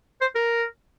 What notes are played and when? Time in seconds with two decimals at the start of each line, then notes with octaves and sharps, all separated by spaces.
0.21 C5
0.35 A#4